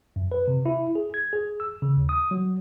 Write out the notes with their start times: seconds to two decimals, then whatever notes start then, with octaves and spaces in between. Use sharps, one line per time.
0.16 F#2
0.32 B4
0.48 C3
0.66 E4
0.95 G#4
1.14 G#6
1.33 G#4
1.60 E6
1.82 C#3
1.97 D#2
2.09 D#6
2.31 F#3